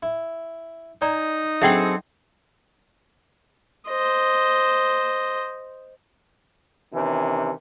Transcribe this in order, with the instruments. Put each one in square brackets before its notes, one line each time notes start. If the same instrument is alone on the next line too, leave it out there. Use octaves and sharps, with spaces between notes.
[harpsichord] E4
[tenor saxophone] D#4 [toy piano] D5 A#5 [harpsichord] G#5
[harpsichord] F#3 B4 [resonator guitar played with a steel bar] C4 G#4 A4 [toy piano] E5 F#5 G5
[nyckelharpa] C5 D#5
[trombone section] C3 D#3 E3 C#4